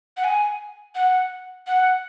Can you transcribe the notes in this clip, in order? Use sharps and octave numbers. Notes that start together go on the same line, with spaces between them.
F#5
G#5
F#5
F#5